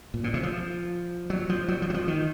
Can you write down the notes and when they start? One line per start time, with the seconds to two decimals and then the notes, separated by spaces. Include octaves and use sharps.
0.14 A#2
0.24 A#2
0.34 C3
0.43 F3
1.30 F#3
1.49 F3
1.68 F#3
1.82 F3
1.90 F#3
1.94 F3
2.08 D#3